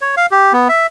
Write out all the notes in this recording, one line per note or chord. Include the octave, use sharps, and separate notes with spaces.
C#5
F5
G4
B3
E5